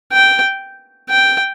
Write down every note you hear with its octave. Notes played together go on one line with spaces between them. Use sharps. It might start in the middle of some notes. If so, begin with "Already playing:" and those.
G5
G5